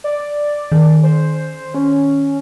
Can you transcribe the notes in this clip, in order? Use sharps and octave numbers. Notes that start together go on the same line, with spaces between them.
D5
D#3
C5
C#4